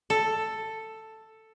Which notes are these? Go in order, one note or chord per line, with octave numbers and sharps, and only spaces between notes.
A4